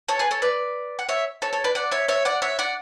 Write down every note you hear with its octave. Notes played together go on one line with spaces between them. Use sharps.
A4 C#5
G#4 B4
A4 C#5
B4 D5
F#5
C#5 E5
A4 C#5
A4 C#5
B4 D5
D5 F#5
C#5 E5
C#5 E5
D5 F#5
C#5 E5
D5 F#5